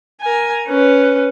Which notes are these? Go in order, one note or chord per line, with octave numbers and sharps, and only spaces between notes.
A#4 G#5
C#4 B4